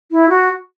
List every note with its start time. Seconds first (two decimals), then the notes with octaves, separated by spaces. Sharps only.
0.12 E4
0.29 F#4